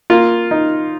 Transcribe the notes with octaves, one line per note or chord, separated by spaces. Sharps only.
A#3 F4
D#4